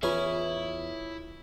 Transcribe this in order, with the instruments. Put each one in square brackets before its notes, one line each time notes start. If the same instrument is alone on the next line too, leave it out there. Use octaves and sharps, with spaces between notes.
[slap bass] E2 E3 [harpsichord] C#4 G#4 [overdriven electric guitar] E4 [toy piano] F4 B4